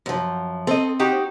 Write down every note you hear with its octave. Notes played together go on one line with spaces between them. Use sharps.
F#2 F3
C4 A4 D#5
D#4 F#4 G4